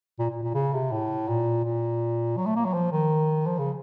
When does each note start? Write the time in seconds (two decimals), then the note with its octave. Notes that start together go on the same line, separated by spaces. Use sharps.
0.19 A#2
0.30 A#2
0.43 A#2
0.54 C#3
0.73 C3
0.92 A2
1.28 A#2
1.64 A#2
2.37 F#3
2.46 A3
2.56 A#3
2.65 F#3
2.74 F3
2.92 D#3
3.46 F3
3.59 C#3